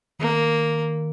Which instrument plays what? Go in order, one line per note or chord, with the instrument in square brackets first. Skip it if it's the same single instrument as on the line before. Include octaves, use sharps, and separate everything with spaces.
[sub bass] D#3 [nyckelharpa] A#3